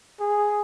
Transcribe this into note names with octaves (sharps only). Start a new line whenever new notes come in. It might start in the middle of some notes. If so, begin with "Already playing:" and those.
G#4